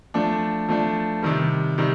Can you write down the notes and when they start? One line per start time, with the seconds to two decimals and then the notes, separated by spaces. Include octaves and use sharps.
0.14 F3 A3 D4
0.69 F3 A3 D4
1.23 C3 D#3 G3
1.78 C3 D#3 G3